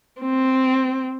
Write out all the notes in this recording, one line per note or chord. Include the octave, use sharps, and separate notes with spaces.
C4